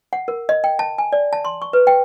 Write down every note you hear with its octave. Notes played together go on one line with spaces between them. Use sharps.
F#5
A#4
D#5
G5
A5
G#5
D5
A5
C6
C#6
B4
G5